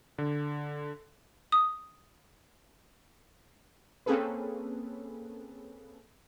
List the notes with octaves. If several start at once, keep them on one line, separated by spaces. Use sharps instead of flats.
D3
D#6
A#3 C4 C#4 G#4 A4 B4